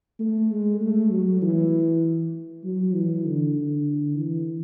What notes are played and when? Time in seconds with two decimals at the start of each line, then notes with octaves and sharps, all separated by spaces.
0.19 A3
0.50 G#3
0.80 A3
1.11 F#3
1.42 E3
2.64 F#3
2.94 E3
3.25 D3
3.56 D3
4.17 E3